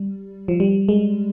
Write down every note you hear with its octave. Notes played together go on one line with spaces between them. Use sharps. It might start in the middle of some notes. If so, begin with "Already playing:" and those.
Already playing: G3
F3
G3
G#3